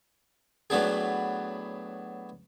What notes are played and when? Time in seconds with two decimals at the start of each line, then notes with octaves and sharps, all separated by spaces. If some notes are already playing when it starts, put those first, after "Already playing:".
0.70 A2 F#3 B3 D4 G#4